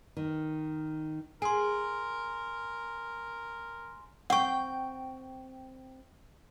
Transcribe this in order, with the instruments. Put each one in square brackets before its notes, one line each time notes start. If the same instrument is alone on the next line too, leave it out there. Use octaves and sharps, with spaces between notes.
[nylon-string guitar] D#3
[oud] G#4 [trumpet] A#4 [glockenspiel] G#5 C6
[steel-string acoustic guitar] C4 G5 [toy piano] F#5 C#6